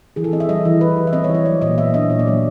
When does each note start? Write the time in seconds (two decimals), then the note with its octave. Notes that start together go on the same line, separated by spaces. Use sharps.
0.16 E3 G#4
0.24 A4
0.32 C4 D#5
0.40 E5
0.49 G3 D#5
0.65 E3
0.81 E3 B4
0.97 G3
1.07 E5
1.13 C4 D#5
1.24 C#5
1.29 E3
1.35 C#5
1.45 F#3 D5
1.61 A#2 D#5
1.78 B3 E5
1.94 D4 D#5
2.10 A#2 C#5
2.19 D5
2.26 F#3 C#5